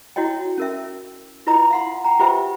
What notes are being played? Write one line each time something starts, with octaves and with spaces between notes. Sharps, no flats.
E4 F#4 C#5 D#5 G5
C#4 A#4 E5
E4 F4 B4 D#5 A#5 D#6
F5 F#5 C6
F#5 G5 A#5
F4 G4 B4 C5 E5 G5